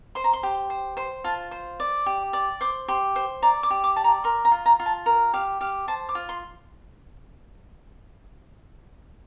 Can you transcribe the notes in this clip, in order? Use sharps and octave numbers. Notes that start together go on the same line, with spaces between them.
C5 C6
A#5
C6
G4
C5
C5 C6
F4 A5
C5
D5
G4
D5
C5 D6
G4 C6
C5
D5 A#5
D6
G4
D6
D5 A5
A#5
A#4 C6
A#5
F4
A#5
F4
A5
A#4
G4 F5
G4 F5
C5 A5
D6
F4
C6